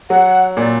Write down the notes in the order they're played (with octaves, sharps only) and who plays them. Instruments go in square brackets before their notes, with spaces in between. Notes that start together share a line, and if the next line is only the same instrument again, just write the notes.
[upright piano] F#3 [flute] F#5
[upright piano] A#2 [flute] D5